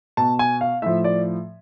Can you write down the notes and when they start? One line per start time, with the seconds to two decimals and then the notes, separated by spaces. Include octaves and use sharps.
0.17 B2 A5
0.39 G#5
0.61 F5
0.82 A2 F3 E5
1.04 D5